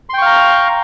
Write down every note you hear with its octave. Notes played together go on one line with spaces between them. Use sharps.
F5 G5 A#5 C6 C#6